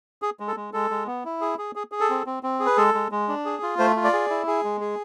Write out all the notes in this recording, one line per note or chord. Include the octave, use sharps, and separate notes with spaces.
G#4
G#3
A4
G#3
G#3 A4
G#3
B3
E4
G#4
G#4
G#4
G#4
A4
C4
C4
C4
G#4
B4
G#3 A4
G#3
G#3
D4
G#4
F4
A3 C5
F4
D5
G#4
E4
G#4
G#3
G#4